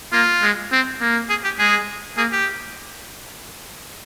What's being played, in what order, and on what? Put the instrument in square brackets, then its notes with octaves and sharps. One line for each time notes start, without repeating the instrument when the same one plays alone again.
[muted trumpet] A#3 [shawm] F4
[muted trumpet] G#3
C4
A#3
[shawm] G#4
G4
[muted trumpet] G#3 [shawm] G#4
[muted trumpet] A#3 [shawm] G#4
[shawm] G4